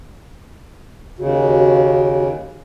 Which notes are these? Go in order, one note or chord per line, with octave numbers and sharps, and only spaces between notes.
D#2 C#3 F#4